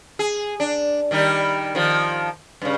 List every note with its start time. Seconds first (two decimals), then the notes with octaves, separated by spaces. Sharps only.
0.19 G#4
0.60 D4
1.11 D#3 G3 D#4
1.75 D#3 F3
2.62 G2 C#3